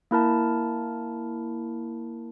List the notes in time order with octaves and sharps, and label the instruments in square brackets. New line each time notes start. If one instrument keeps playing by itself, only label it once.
[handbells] A#3 E4 A#4 A5